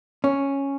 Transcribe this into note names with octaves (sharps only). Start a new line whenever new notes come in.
C#4